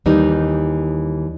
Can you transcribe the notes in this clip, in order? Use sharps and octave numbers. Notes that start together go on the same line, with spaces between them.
D#2 E3 G3 D#4